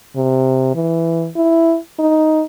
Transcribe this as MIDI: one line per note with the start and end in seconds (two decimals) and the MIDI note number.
0.16 0.71 48
0.75 1.29 52
1.36 1.78 64
1.99 2.44 63